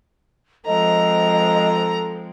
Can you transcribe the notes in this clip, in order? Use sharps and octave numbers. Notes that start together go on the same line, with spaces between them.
F3 G#3 C4 A4 D#5 A#5